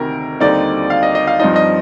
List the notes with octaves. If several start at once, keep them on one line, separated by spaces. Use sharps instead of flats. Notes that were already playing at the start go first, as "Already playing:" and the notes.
Already playing: D2 C3 D#3 A#4
D#2 D3 G3 C4 D#4 D5
F5
D#5
D#5
F5
G2 F3 C4 D#4 D#5
D#5